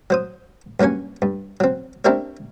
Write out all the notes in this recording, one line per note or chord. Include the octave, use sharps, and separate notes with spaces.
F#3 C5 D#6
G2 F#3 A#3 C#4 G#5
G2
F#3 C4
C4 D4 E4 G4 A#4 C#5